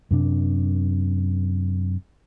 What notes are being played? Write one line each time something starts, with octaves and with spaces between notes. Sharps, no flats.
F#2 C3 D4